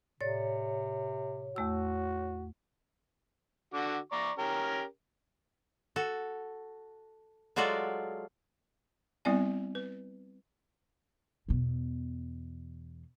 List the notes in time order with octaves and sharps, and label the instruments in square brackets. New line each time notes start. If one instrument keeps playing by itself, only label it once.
[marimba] A2 D5 A6 [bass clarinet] C3 [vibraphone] C#5
[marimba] E2 A3 E6 [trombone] F#4
[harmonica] D3 F#4 D6
D5 A#5 C#6
C#4 G4 A#4
[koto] F#4 A4
F#3 G#3 F4 F#4 A4 D5
[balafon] G3 B3 C4 E4 D5 G#5
B4
[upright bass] E2 B2